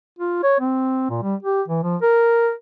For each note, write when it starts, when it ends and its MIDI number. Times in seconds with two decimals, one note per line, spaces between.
0.19 0.40 65
0.43 0.56 73
0.60 1.09 60
1.09 1.19 46
1.23 1.35 55
1.43 1.62 67
1.68 1.83 52
1.83 1.96 53
2.01 2.52 70